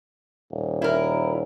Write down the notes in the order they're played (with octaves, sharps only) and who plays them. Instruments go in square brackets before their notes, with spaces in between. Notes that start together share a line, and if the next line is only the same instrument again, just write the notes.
[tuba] D#1
[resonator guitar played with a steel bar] E4 A#4